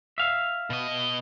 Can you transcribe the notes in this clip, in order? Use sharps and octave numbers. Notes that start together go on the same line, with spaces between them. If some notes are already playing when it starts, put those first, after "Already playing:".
E5 F5
B2 D#5